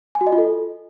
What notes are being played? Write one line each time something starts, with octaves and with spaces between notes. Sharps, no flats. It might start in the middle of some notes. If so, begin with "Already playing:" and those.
G#5
F#4
D#5
F4
A4